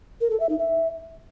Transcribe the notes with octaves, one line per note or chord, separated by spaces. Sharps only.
A#4
A4
E5
D#4
E5